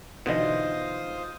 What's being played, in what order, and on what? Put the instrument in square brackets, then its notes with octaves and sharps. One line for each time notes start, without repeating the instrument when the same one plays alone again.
[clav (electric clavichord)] B2 D3 E3 [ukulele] D#4 D#5 [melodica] F4 C5 D#6